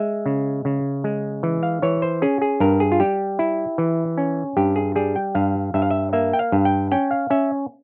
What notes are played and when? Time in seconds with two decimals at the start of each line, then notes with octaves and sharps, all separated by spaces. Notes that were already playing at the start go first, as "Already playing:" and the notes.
Already playing: G#3 E5
0.26 C#3
0.65 C#3
1.04 G#3
1.43 E3
1.63 F5
1.82 E3 C#5
2.02 C5
2.22 C#4 G#4
2.42 G#4
2.60 G2 A#4
2.80 G#4
2.92 F4
3.00 G3 G4
3.39 E4
3.78 E3
4.18 C#4
4.57 G2 G4
4.76 G#4
4.96 G3 G#4
5.16 G5
5.35 G2 F5
5.74 G2 E5
5.82 F5
5.90 E5
6.13 A#3 E5
6.33 G5
6.39 F5
6.52 G2
6.65 G5
6.92 C#4 G5
7.11 F5
7.30 C#4 E5